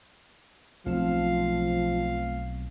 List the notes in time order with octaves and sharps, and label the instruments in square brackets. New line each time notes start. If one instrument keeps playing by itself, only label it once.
[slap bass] B1 [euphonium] F3 [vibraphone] A3 C4 [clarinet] F5